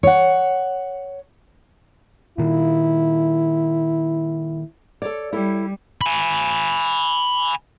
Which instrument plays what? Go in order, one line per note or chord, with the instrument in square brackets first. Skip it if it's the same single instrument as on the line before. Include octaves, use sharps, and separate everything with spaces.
[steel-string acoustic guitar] C#5 F#5
[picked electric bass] A#2 D#3 [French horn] E4
[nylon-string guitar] A4 C#5 D5
[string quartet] G3 [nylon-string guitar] E4 A4 C#5
[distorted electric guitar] G#5 B5